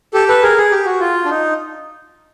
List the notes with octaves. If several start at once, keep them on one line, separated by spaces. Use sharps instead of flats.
G4 A4
A4 B4
G#4 A#4
G#4
G4
F#4
F4
D4
D#4